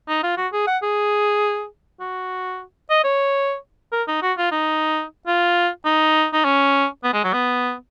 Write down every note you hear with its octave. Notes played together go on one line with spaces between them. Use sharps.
D#4
F4
F#4
G#4
F#5
G#4
F#4
D#5
C#5
A#4
D#4
F#4
F4
D#4
F4
D#4
D#4
C#4
B3
G#3
F#3
B3